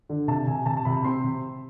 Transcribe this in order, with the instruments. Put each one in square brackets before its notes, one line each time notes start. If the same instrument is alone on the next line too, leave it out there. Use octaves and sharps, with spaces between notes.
[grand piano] D3
C3 A5
C3 G#5
C3 A5
A5
C3 B5
C4 C6
C3